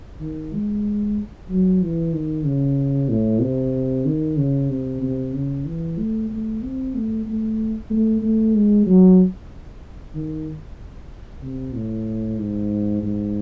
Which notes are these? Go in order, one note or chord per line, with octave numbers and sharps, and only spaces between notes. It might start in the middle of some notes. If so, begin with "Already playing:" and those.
D#3
G#3
F#3
E3
D#3
C#3
A2
C3
D#3
C#3
C3
C3
C#3
E3
A3
A3
C4
A3
A3
A3
A3
G#3
F#3
D#3
C3
A2
G#2
G#2